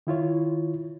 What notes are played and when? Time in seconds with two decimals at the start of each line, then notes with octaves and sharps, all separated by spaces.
0.07 D#3 E4 F4 C#5